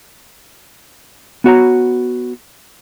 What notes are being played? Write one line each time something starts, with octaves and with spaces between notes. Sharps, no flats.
B3 F#4 C#5 A#5